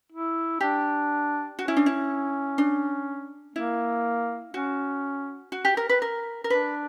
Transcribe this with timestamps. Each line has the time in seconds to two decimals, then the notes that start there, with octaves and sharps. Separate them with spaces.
0.12 E4
0.60 D4 G4
1.59 C#4 F#4
1.68 E4
1.77 D4
1.86 E4
2.58 D4
3.55 A#3 E4
4.54 C#4 F#4
5.52 F#4
5.65 G4
5.77 A#4
5.89 B4
6.02 A#4
6.44 A#4
6.50 D4 B4